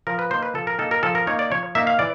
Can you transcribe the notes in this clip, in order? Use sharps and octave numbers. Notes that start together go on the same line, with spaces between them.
F3 A#4
B4
A#3 D#4 C5
B4
F3 A4
A#4
A#3 D#4 A4
A#4
F3 A4
A#4
A#3 D#4 C#5
D5
F3 C#5
A#3 D#4 E5
F5
E3 D5